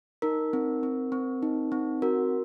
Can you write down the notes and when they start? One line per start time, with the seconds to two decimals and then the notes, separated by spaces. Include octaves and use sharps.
0.22 D#4 A#4
0.53 C4
0.83 C4
1.12 C4
1.43 D#4
1.72 C4
2.02 F#4 A#4